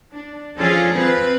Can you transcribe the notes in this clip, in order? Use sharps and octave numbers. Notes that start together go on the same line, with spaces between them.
D4
F3 C#4 D4 F4 G#4 A4
C4 F4 B4